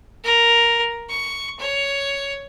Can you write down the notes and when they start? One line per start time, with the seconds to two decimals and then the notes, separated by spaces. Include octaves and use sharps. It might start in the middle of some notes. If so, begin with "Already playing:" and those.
0.24 A#4
1.09 C#6
1.59 C#5